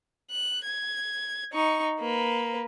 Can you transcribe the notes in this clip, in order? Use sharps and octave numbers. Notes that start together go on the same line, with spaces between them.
F#6
G#6
D#4 C#6
A#3 B4